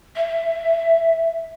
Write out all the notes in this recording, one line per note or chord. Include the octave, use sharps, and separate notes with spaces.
E5